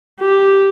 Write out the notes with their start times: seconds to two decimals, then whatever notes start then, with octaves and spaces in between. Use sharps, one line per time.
0.20 G4